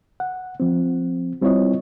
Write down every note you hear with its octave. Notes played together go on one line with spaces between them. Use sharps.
F#5
F3 C4
G3 C4 E4 F4 C#5 D#5